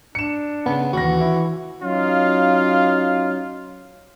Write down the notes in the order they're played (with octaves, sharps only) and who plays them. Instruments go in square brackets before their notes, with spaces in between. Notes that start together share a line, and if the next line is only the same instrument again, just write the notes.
[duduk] D4 [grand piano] C#7 E7
[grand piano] C#3 [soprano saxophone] B3
[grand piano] D#2 A#6 [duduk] E3 [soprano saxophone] F#4
[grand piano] E4
[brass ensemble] F#3 C#4 D#4 F4 F5